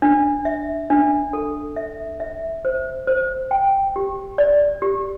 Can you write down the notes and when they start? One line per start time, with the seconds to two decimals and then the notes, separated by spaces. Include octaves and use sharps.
0.02 D4
0.45 E5
0.90 D4
1.33 A4
1.76 E5
2.20 E5
2.65 C5
3.07 C5
3.51 G5
3.96 G4
4.38 D5
4.82 G4